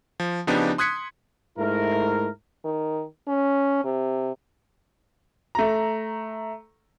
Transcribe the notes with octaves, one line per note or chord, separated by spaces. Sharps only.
F3
C#3 F3 B3 D4 D#4 G4
C6 D#6 F#6 G#6 B6 C#7
G#2 A3 E4 A#4
D#3
C#4
C3
A3 A#5